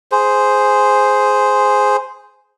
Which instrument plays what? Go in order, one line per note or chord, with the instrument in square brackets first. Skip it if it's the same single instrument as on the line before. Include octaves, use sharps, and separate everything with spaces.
[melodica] G#4 C5